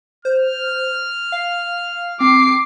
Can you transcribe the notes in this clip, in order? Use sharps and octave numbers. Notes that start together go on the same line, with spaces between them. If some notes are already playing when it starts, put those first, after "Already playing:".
C5 F6
F5
C4 D6 C7